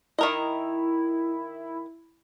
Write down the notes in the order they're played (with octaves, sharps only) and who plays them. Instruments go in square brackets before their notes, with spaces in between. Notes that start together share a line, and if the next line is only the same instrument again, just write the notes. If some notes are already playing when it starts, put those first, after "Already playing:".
[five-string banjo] D#3 A#4 D#5 [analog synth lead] E4